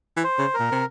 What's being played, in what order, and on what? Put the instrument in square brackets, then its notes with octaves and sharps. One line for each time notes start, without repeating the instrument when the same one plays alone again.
[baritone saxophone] E3
[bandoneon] C5
[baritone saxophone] C#3
[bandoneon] A#4
[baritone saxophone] A#2
C3